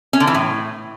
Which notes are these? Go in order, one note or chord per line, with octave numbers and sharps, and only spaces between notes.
C#4
D3
E3
A2